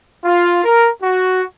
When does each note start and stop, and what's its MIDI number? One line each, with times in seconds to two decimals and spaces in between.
0.24 0.62 65
0.64 0.90 70
1.02 1.42 66